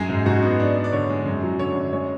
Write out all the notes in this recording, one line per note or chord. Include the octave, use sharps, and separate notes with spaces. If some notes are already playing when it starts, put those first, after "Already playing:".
Already playing: F#2 G#3 G#4
G#2
G#2 F#4
B3
D4
D4
D5
D3 C#5
G#3
F#2
F#3
D3 C#5
F#2
G#3 C#5